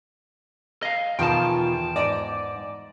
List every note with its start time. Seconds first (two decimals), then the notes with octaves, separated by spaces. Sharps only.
0.83 D#5 F5
1.19 E2 B2 D#3 F3 F4 G5 A5
1.96 G#2 D5 D#5 D7